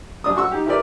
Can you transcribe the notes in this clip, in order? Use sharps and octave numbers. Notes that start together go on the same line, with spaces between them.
F#2 D4 D#6
F#4 C#6 E6
D#4 G4
E4 G4 A#4 B4 D5